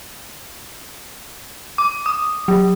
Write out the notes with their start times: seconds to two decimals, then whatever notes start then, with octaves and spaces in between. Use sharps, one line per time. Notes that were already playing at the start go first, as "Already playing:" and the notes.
1.78 D6
2.06 D#6
2.48 F#3